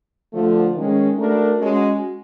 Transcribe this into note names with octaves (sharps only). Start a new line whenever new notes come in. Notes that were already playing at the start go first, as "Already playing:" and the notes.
D3 F3 A3
D#3 G#3 C#4
A3 D4 F#4 A#4
G#3 C#4 F#4